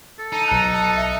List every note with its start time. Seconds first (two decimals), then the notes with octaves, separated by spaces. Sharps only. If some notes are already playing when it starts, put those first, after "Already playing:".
0.19 A4
0.32 D#4 A5
0.48 B1 A#5 F#6
0.72 A5
0.96 E5